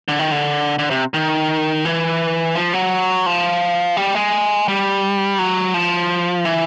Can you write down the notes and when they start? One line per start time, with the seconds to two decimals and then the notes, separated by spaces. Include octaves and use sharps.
0.08 D3
0.19 D#3
0.31 D3
0.79 D3
0.90 C3
1.14 D#3
1.85 E3
2.55 F3
2.73 F#3
3.26 F3
3.97 G3
4.15 G#3
4.68 G3
5.39 F#3
5.74 F3
6.45 E3